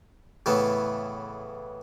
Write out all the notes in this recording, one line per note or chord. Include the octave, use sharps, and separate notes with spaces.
A2 C#3 E3 B3